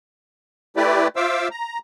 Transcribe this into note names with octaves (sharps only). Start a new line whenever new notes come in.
A3 E4 G4 B4 D5
F4 C5 E5 F5 D6 E6
A#5